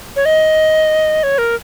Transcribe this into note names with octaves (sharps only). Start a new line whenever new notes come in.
C#5
D#5
C#5
A#4